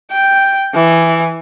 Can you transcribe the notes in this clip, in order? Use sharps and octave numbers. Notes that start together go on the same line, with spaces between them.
G5
E3